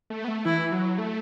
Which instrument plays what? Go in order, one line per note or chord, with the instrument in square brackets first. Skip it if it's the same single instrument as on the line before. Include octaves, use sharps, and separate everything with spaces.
[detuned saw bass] A3
B3
A3
[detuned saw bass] E3 [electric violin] E4
[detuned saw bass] F#3
A3